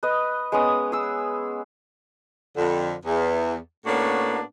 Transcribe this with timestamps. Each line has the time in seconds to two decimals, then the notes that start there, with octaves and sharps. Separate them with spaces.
0.03 B4 D#5
0.52 G#3 B3 C#4 D#6
0.92 G#4 E6
2.56 F2 D3
3.05 E2
3.85 A2 A#3 B3 C#4 D4 F#4